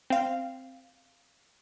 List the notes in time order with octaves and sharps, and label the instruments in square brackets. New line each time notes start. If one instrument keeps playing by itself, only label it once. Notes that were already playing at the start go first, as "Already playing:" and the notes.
[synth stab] C4 F5